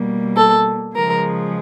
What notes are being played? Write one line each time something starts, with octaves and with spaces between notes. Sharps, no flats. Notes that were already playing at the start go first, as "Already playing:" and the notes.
Already playing: B2 G3 A#3
A4
C#3 F3 G#3 A#4